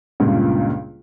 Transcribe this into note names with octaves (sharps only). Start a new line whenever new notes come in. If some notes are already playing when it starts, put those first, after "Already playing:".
C#2 G2 A#2 C#3